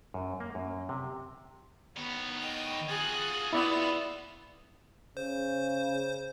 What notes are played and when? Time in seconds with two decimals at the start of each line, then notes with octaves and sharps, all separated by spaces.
0.14 F#2
0.40 A#3
0.55 F#2
0.89 C3
1.97 D#3 B3 C#5
2.40 D#5 G5
2.89 F4 F#4 G#4 G#5 F#6
3.53 B3 E4 D5 F#5 E6
5.17 C#3 C5